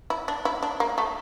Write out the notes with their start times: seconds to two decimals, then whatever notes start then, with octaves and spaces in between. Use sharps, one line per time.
0.10 E4
0.28 D4
0.45 E4
0.63 D4
0.80 A#3
0.98 A3